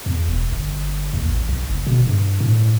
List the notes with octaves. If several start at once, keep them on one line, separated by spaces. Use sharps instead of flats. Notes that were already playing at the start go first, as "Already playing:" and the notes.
E2
E1
G1
D#2
A1
B1
F#1
B2
G2
A2